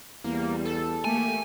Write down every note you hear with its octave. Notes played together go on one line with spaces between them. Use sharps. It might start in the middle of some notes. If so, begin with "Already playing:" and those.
E2 G3 A#3
A4
A3 A#3 G4 G#5